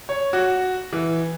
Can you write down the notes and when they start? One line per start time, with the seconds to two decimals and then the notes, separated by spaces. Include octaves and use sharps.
0.09 C#5
0.33 F#4
0.93 E3